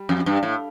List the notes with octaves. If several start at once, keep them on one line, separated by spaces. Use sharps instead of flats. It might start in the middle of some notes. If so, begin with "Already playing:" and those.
Already playing: G3
F2
G2
A2